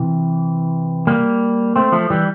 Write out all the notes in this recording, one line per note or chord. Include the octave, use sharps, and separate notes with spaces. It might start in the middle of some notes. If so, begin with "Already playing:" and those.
Already playing: C3 E3
G3 A#3
A3 C4
F3 A3
E3 G3